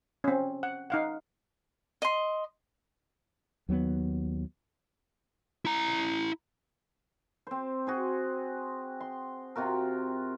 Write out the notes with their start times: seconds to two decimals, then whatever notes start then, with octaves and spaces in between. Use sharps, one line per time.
0.24 C4 C#4
0.63 F#5
0.90 D#4 F5 F#5
2.02 D#5 C6
3.69 D#2 F#3 G3 B3
5.65 E4 A#5
7.47 C4 C5
7.87 F#4 G#4 C5
9.00 C6
9.56 C3 F4 F#4 A#4